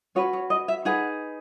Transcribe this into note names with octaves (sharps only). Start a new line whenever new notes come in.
C#4 F#4 B4 C#5
C#5
D#5
E5
D#4 G#4 B4 F#5